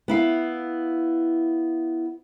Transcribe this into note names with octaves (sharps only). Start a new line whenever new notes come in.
B3 E4 F5